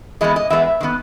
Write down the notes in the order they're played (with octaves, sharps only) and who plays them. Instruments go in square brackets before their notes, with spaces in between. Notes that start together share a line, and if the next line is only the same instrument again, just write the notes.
[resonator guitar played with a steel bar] E3 G#3 B3 D#5
D#5
E3 G#3 B3 E5
D#3 G#3 B3